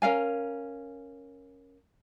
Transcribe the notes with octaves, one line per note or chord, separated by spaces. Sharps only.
C#4 A#4 F5 G#5